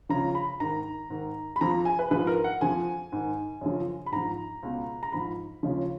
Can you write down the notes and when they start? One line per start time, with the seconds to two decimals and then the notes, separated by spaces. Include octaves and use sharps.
0.09 C#2 C#3 F3 A#5
0.35 B5
0.60 G#2 D#3 A#5
1.10 G#2 D#3
1.56 B5
1.61 F2 F3 A#5
1.85 G#5
1.99 B4
2.10 G#2 F3 B4
2.27 A#4
2.44 F#5
2.61 F2 F3 G#5
3.12 G#2 D#3
3.61 F#2 C#3 F3
4.06 B5
4.12 G#2 F3 A#5
4.63 C#2 B2
5.03 A#5
5.12 G#2 F3 B5
5.63 D#2 C#3 F3